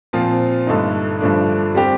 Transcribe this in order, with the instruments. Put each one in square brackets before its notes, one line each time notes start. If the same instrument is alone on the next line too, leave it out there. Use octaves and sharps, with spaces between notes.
[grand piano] A#2 F3 C4 F4
G2 D3 A3 D#4
G2 D3 F3 A3 D4
G3 C4 G4